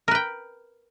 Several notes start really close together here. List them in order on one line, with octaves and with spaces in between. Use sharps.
A#4 B4 G5